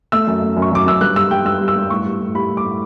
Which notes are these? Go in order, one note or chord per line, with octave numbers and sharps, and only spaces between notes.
A3 E6
F#2
A3
F#2
C#6
F#2 D6
F#2 E6
G2 F#6
G3 E6
G2 G5
G2 E6
G3
E6
G2
A2 C#6
G3
A2
G3 B5
A2
D6
A2